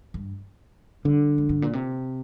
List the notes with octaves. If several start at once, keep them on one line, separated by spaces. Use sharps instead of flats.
G2
D3 G3
F2
G2
A#2
C3